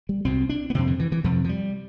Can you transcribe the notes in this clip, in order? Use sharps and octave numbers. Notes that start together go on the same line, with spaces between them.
G3
C2 B2 C4
D4
B3
F2 C3 C4
D3
E3
E3
F2 C3 F3
F3
G3